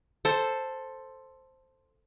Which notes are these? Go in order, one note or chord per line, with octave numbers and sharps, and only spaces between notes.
A4 C5